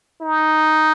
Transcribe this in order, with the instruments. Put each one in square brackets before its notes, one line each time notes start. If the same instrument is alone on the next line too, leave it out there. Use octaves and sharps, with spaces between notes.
[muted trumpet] D#4